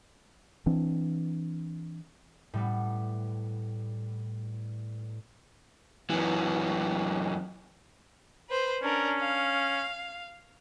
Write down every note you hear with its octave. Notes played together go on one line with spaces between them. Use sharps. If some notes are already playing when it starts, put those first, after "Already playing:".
E3 C4 D4
A2 G3 B3
F#2 E3
B4 C5
C#4 D4 A#4
F5